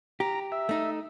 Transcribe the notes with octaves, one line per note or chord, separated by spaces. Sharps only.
G4 A#5
E5
A3 D#4